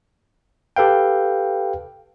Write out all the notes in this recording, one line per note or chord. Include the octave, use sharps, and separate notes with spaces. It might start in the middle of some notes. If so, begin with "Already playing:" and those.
G4 A4 B4 F5 G5